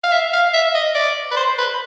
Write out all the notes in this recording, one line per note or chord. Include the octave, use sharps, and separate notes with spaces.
F5
E5
F5
E5
D#5
D5
B4
C5
B4